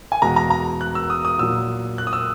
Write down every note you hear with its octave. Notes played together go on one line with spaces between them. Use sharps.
G#5
E2 B2 G#3 A#5
A#5
A#5
F#6
E6
D#6
D#6
A#2 F#3 E6
F#6
D#6
E6